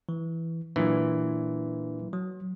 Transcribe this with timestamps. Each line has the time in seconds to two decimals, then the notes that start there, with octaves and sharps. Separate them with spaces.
0.09 E3
0.76 A#2 E3 F#3 D4
2.13 F#3